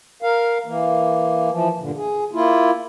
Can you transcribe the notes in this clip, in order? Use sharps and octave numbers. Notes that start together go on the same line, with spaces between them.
A#4 F5
E3 A#3
E3 F3
G2 A#2 D3
G#4
A#3 E4 F4